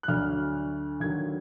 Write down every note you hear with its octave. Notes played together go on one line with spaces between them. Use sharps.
F#6
D2 D3 F#3 D4 F6
D#2 D3 F#3 G#6